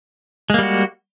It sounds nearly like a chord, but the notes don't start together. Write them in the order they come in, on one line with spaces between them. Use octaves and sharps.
G#3 A#3 G3 F#4